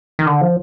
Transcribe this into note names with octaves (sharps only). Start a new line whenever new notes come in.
D#3
D3
F3